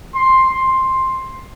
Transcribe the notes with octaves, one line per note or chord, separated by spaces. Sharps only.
C6
C6